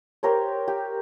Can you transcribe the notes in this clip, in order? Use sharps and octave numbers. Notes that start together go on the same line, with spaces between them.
G4 A#4 C5 C#5
G4